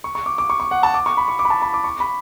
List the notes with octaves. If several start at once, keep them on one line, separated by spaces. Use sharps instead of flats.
C#6
C#6
D6
D6
C#6
C#6
F#5
A5
D6
C#6
B5
C#6
D6
B5
A5
B5
D6
C#6
B5